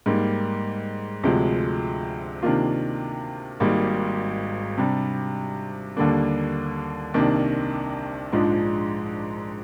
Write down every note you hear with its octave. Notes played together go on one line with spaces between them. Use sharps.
G#2 G3 A#3
D2 C3 F3 G#3
C3 D#3 A#3 D4 F4
G#1 G#2 G3 A#3
C3 G3 D4
D#2 D3 G3 A#3 D4
C2 C3 D#3 A#3 D4
A#1 G#2 F3 G#3 D4